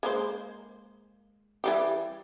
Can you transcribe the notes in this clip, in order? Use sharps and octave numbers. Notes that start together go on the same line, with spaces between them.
G#3 A#3 C5
E3 G3 G4